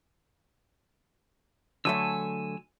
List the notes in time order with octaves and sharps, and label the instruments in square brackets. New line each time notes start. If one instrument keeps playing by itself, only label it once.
[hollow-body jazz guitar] D3 F#3 A3 [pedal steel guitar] G#5 E6